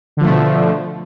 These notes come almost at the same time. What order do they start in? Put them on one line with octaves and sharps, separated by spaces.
D3 F3 A3 B2